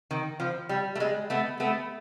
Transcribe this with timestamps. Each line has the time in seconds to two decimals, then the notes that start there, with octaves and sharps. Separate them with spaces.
0.11 D#3
0.40 F3
0.69 G3
0.95 A3
1.00 G#3
1.30 A3 B3
1.60 A3 B3